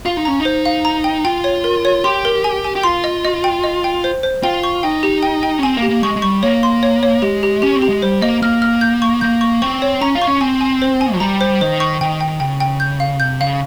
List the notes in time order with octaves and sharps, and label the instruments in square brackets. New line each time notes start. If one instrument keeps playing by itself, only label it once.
[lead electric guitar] F4 [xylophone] F5
[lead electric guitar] D#4
[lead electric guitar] C#4 [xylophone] A#5
[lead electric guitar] D#4
[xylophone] C5
F5
A#5
G5
[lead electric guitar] F4 [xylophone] G5
[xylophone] C#5
A#4
C#5
[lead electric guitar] G4 [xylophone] C6
[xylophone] A#4
G#5
G#5
[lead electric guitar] G4
[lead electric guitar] F4 [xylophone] C6
[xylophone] D#5
D#5
G5
D#5
G5
C5
C5
[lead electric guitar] F4 [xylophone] G5
[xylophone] C#6
[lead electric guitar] D#4 [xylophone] G5
[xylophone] G4
G5
G5
[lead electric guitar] C#4
[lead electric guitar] C4 [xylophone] G#5
[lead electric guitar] A#3
[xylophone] G4
[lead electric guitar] A#3
[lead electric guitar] G#3 [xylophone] C#6
[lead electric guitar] G#3
[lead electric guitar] G3 [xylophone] C#6
[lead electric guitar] A#3 [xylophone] C#5
[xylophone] C6
C#5
C#5
[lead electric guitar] G#3 [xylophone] G4
[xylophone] G4
[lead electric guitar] C#4 [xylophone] G4
[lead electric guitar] C4
[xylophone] G4
[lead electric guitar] G#3
[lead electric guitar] G3 [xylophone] C5
[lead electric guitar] A#3 [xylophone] D#5
[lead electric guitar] A#3 [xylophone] F6
[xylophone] F6
G6
C#6
[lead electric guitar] A#3 [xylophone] G6
[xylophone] C#6
[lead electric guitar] C4 [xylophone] C#6
[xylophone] C#5
[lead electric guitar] C#4 [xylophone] A#5
[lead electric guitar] F4
[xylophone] C#6
[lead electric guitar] C#4
[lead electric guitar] C4 [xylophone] G#5
[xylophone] G#5
C5
G#5
[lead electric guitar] F3
[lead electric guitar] G3 [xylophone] A#5
[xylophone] C5
[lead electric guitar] D#3 [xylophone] C5
[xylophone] C#6
[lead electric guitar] D#3 [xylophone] G5
[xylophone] G5
[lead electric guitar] C#3 [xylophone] G5
[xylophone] G5
G6
F5
[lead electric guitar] C3 [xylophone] G6
[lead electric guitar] C#3 [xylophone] F5